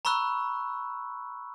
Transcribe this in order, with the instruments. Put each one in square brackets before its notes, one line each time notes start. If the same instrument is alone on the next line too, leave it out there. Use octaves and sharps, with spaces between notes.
[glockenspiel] A#5 B5 C#6 E6 F#6